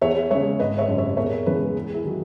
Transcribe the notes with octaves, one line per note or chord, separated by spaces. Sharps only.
E2 C#5 E5
C#3 G#3 C#5 E5
G#1 B4 D#5
C#5 E5
F#2 C#3
C#5 E5
E1 A#4 C#5
E2 C#3 E3 G#3 G#4 B4
E2
E4 G#4
D#3 F#3